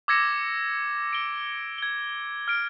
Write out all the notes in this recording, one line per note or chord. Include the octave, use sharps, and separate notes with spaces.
D6 E6 G#6 A#6 C#7 E7
D7 G7
G#6 G7
F6 D7